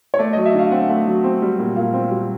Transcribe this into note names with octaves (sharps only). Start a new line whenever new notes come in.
C#5
A3 D5
F#3 D#5
E5
D3 F5
C4 F#5
A3
F#3
C4
G3
A#2
A#2 F5
C4
G3